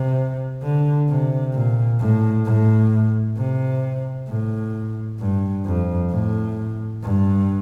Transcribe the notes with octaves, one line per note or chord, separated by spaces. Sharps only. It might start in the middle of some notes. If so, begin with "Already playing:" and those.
Already playing: C3
D3
C3
A#2
A2
A2
C3
A2
G2
F2
A2
G2